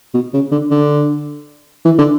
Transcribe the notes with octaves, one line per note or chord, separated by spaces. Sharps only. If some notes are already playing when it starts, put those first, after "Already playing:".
B2
C#3
D3
D3
E3
D3